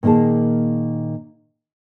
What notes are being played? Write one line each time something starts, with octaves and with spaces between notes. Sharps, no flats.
A#2 D#3 A#3 G#4 A5